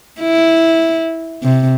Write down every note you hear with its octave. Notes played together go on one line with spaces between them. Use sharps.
E4
C3